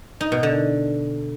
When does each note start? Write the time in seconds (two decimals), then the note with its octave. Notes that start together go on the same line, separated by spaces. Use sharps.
0.21 D#4
0.32 B2
0.43 D3